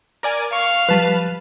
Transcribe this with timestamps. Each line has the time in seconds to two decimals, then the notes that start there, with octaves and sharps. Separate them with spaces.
0.23 A#4 D5 G#5
0.53 F5 C#6
0.89 F3 G3 B4 A5